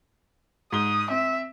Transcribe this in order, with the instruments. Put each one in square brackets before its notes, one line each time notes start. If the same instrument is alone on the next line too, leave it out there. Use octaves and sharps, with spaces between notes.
[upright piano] G#2 G7 [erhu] D#6
[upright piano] C4 [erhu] E5